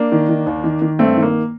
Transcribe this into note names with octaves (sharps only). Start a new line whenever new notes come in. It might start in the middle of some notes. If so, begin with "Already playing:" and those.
Already playing: A#3 D4
D#3
D#3
D#2
D#3
D#3
G2 A3 C4
D#3
A#3